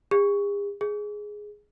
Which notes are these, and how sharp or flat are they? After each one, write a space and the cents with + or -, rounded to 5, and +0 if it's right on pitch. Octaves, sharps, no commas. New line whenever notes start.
G#4 -45
G#4 +5